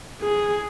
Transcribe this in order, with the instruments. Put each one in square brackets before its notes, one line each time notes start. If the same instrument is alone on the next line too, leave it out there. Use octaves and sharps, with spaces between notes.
[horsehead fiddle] G#4